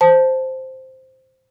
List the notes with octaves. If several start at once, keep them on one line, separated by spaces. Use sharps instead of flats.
C5 A5